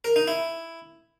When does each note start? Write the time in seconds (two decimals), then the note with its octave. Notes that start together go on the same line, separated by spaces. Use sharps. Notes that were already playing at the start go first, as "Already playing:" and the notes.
0.04 A#4
0.16 D#4
0.28 E4